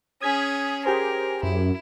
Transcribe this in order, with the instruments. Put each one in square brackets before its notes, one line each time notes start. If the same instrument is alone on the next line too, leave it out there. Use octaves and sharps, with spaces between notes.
[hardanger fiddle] C#4 G#4 [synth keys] D#6 G#6 B6
[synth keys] G4 G#4 C5 [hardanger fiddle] A#4
[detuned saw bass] F#2 [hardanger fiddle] E4